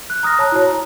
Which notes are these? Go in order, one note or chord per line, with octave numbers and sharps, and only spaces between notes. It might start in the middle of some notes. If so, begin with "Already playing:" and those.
F#6
A#5 D#6 F6 A#6
C#5 A5 A#5 F#6
E4 F#4 C#5
A#5